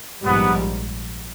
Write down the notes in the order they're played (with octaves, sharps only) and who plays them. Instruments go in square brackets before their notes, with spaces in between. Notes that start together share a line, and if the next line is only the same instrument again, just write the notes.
[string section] A#1 G#2 G3 [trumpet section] B3